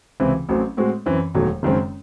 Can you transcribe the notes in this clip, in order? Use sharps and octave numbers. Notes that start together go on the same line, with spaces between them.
C#2 C3 E3 C4 E4
A1 A2 F#3 C4
A2 G#3 C4 F#4
F#2 E3 C4
E1 E2 D#3 F#3 A3
F#1 F#2 D#3 G#3 C4